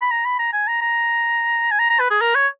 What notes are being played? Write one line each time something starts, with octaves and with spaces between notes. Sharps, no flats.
B5
A#5
B5
A#5
G#5
A#5
A#5
G#5
A#5
A#5
B4
G#4
A#4
C#5